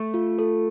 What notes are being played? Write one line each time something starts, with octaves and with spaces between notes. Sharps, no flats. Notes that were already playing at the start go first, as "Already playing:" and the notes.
Already playing: A3
F4
A4